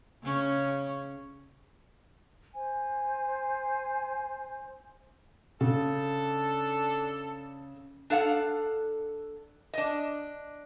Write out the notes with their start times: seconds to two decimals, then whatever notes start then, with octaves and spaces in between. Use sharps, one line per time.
0.23 C#3 C#4
2.55 C5 G#5
5.61 C#3 D4 A4
8.10 D4 A4 F5 F#5
9.74 D4 D#5